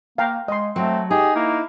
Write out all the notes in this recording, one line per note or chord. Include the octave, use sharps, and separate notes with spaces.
A#3 F5 G5 A#5
G#3 D#5 C6
F#3 A3 C4
D#4 G4 G#4
A#3 E4